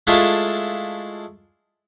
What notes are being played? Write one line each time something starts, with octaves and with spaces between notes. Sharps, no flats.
G#3 A3 D4 E4 F4